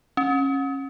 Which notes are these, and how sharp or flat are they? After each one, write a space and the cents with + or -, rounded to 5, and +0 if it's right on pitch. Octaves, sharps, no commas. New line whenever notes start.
C#4 -25